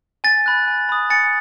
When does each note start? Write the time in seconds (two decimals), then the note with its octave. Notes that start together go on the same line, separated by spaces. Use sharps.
0.24 G#5 A6
0.46 B5 F#6
0.68 G#5
0.89 B5 D#6
1.10 G#5 A6 C#7